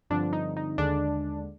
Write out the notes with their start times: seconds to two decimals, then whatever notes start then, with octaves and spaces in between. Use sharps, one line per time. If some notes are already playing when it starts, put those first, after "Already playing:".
0.10 G2 D3 F3 C4 D4
0.33 D#4
0.57 D#4
0.78 D#2 D3 G#3 D4